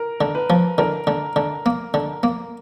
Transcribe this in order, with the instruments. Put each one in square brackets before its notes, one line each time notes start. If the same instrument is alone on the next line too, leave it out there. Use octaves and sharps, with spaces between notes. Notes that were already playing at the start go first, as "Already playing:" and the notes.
Already playing: [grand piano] A#4
[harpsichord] D3
[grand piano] B4
[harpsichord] F3
[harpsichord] D3 [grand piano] A#4
[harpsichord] D3
D3
A#3
D3
A#3